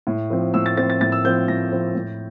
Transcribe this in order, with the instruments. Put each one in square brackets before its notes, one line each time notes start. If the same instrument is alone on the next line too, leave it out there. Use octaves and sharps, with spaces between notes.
[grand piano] A2
F3 C4
A2 E6
A6
F3 C4 A6
A6
A2 A6
E6
F3 C4 G6
A2 A#6
F3 C4
A2